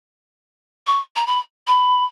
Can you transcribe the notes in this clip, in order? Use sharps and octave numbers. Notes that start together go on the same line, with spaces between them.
C#6
A#5
B5
B5